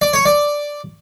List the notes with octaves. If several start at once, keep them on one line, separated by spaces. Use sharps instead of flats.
D5
C#5
D5